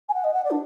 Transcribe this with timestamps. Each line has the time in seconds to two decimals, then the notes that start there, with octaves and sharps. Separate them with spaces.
0.08 G#5
0.14 F#5
0.24 D#5
0.33 F#5
0.44 D5
0.50 D4